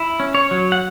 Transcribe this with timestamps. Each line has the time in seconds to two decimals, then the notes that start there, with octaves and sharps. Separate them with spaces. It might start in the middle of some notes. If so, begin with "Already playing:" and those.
Already playing: E4
0.20 C#4
0.35 C#5
0.51 F#3
0.72 F#5